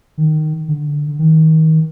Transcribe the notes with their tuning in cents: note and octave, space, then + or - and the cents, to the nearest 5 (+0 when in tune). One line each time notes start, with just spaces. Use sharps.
D#3 -10
D3 +0
D#3 +30